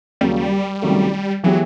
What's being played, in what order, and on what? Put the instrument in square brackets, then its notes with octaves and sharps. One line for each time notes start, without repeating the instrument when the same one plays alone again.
[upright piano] D#2 C#3 F#3 A#3 [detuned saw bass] G3
[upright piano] C#2 C3 D#3 F#3 A3
[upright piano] E3 G#3 B3 E4 G4 [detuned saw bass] F#3